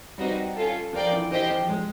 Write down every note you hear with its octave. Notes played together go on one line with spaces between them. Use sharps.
G3 C4 D#4 F#4 B4 D#5
C#4 F4 A4
F3 F4 A#4 D5 G5
E3
E3 G4 C5 D#5 G5
F3
G#3